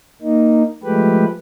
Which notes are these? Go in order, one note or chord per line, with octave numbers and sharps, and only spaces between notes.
A#3 D#4
F3 G#3 A3 G4 B4